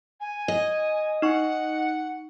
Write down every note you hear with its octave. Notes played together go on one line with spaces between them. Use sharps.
G#5
D#5
D#4 F#5 C#6